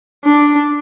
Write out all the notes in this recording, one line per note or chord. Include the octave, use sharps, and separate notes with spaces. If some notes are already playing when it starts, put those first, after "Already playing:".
D4